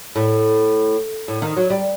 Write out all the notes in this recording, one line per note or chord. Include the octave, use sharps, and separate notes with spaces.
A2
A2
D#3
F#3
G3